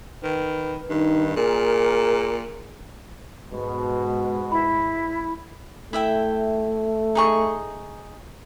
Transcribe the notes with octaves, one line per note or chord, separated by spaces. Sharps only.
D#3 B4
G2 D#3 D#4
A#2 G#4 A#4
G#2 B2 G#3
E4 B5
A3 E4 E5 G5
D#4 G#4 C#6